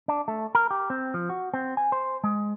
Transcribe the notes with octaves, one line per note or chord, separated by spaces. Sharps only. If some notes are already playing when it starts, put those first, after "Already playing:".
D4
A3
A#4
G4
C4
F3
F#4
C4
G#5
C5
G#3